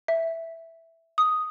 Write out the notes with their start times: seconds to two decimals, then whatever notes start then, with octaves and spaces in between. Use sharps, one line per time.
0.08 E5
1.18 D#6